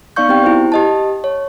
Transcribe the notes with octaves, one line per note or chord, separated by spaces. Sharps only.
B3 D#4 D5 F5 C#6 G6
B3 C4 G4 G5
E4 F#4 C5
G4 D#5 A5
C#5